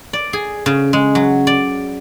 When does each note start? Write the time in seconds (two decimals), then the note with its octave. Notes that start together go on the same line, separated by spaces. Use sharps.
0.13 D5
0.33 G#4
0.66 C#3
0.93 G#3
1.15 F#3
1.47 D5